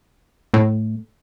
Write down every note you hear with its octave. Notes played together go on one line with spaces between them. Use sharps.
A2